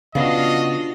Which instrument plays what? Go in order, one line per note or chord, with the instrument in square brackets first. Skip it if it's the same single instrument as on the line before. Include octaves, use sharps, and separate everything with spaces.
[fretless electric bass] C#3 B3 [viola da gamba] D4 F4 F#4 [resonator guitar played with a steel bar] D5 F5 [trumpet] D#5